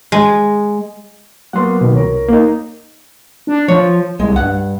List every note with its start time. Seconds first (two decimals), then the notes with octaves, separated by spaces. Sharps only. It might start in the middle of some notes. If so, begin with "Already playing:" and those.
0.12 G#3
1.53 F#3 A#3 B3 F#5 C6
1.81 B2 D#3
1.94 C2 A#4 C#5
2.29 A#3 D#4
3.47 D4
3.68 F3 C#5
4.20 C2 G#3
4.36 G2 F#5